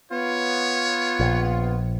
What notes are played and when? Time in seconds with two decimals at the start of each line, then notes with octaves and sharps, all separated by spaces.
0.11 B3 F4 C#5
1.20 A#1